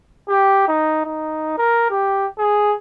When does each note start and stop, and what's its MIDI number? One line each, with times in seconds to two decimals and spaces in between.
0.29 0.66 67
0.68 1.04 63
1.06 1.56 63
1.58 1.86 70
1.90 2.26 67
2.39 2.75 68